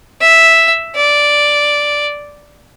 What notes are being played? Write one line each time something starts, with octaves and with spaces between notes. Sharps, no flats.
E5
D5